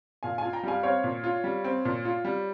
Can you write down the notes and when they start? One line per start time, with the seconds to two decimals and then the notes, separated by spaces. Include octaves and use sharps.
0.23 A#2 F5 G#5
0.38 F4 F5 G#5
0.53 G5 A#5
0.63 G3 F5 G#5
0.83 C4 C#5 F5
1.04 A#2
1.24 F4
1.44 G3
1.64 C4
1.85 A#2
2.05 F4
2.25 G3